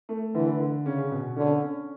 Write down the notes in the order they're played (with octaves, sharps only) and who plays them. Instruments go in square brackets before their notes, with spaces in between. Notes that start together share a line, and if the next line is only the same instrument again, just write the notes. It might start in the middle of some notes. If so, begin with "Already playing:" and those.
[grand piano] A3
[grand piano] D3 [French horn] E3
[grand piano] D3
[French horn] C#3 [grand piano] C#4
[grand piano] B2
[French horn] D3 [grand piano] C#4
[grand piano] C#4